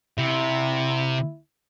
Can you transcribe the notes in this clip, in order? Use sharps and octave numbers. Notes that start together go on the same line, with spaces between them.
C3 E4